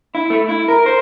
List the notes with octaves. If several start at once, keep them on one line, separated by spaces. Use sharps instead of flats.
E4
A3
E4
A#4
C5